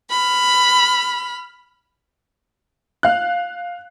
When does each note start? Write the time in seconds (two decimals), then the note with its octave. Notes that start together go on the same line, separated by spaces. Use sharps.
0.10 B5 F6
3.03 F5 F#6